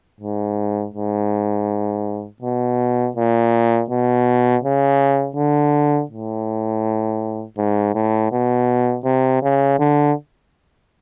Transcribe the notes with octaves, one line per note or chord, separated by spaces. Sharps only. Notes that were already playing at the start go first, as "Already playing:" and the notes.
G#2
G#2
B2
A#2
B2
C#3
D3
A2
G#2
A2
B2
C3
C#3
D3